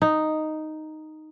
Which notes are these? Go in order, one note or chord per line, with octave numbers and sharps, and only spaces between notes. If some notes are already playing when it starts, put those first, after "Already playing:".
D#4